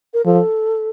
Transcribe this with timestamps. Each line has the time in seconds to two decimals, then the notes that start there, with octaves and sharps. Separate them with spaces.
0.14 A#4
0.26 F3 A4